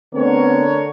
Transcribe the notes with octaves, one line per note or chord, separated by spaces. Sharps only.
D3 A3 B3 C4 A#4 C#5